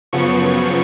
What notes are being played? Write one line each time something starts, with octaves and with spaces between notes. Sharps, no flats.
F#2 C#3 F3 B3 C#6